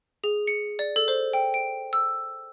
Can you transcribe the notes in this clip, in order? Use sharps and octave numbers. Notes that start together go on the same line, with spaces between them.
G#4
C#7
D5
A4
C5
G5
D7
E6